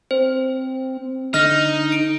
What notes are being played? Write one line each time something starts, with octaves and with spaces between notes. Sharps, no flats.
C4 C5
D3 D#4 F6 A#6
D7